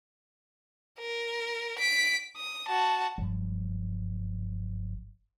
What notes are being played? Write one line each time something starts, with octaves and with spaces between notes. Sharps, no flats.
A#4
B6 D7
D#6
F#4 A5
F#1 G2 F3 F#3